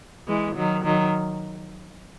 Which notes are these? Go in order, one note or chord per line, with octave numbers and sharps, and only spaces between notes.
E3 G#3
D#3 F#3
D#3 F#3